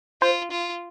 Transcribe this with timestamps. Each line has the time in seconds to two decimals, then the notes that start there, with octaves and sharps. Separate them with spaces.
0.21 F4 C5
0.51 F4